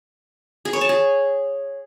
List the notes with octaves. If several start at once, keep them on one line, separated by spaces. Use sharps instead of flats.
G#4
C#5
A5
G#4